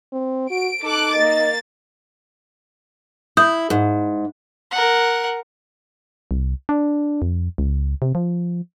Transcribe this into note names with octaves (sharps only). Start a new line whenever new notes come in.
C4
F#4 D7
D#4 A4 D6 F#6
A#3 D#5 A6
E4 D#6 G6
G#2
A#4 F#5
C2
D4
F2
C#2
C3
F3